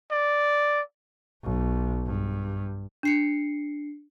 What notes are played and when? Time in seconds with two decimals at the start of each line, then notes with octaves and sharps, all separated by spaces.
0.11 D5
1.43 B1
2.06 G2
3.03 D4 C7 C#7